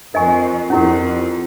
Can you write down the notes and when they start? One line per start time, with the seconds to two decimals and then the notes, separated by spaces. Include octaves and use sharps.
0.14 F2 A#4 D#5 G#5 C#6
0.70 F2 C#4 E4 G4 A#4